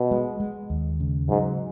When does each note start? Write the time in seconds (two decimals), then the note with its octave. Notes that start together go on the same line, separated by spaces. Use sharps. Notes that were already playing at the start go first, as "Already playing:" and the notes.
Already playing: B2
0.11 G#3
0.40 G#3
0.70 D#2
1.00 C#3
1.29 G#2 F#3